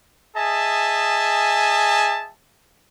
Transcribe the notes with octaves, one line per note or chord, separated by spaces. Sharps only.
G#4 D#5 E5 G#5 A5